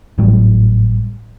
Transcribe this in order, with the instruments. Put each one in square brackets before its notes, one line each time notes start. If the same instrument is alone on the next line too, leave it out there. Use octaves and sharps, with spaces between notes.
[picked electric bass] G#1 A2 F#3 G3